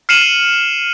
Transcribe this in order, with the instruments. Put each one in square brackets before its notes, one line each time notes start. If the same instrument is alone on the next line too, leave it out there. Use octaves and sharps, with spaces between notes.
[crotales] F6 C7 C#7 D#7 E7 F#7